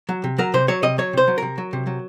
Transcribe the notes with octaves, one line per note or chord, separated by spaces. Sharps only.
F#3
C3
F#3 A#4
C3 C5
F#3 C#5
C3 D#5
F#3 C#5
C3 C5
F#3
C3 A#4
F#3
C3
F#3